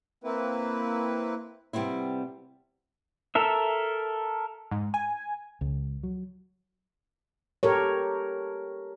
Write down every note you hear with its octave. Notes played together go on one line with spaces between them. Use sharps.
A#3 C4 E4 B4
C3 G3 B3 C4 E4
A4 A#4 E5
G#2
G#5
C#2
F#3
G4 A4 A#4 C#5